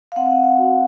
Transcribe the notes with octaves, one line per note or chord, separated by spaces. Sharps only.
F5
C4 F#5
F5
F#4